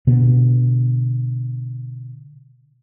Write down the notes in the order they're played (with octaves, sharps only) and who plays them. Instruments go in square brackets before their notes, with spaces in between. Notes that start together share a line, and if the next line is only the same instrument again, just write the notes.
[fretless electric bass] B2 D3 B3